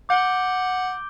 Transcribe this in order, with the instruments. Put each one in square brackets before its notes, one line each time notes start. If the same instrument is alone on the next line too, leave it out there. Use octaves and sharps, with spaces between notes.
[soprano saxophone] F#5 [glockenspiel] D6 G6 D7 G7